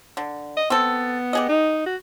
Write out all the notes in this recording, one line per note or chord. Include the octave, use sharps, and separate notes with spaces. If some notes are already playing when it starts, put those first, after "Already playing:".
D3
D#5
B3 C4 A4
G4 G#4 D#5
D#4
F#4